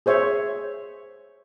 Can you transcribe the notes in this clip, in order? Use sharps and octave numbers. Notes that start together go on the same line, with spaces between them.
G#4 C5 C#5 E5